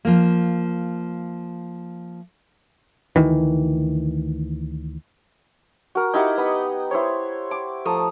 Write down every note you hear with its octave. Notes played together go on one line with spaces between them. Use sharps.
F3 A#3
D2 D#3 E3
F#4 A#4
D#4 E4 G4 F#5
B3 D#5 B5
E4 C5 C#5
D6
F3 A3 A#5 D#6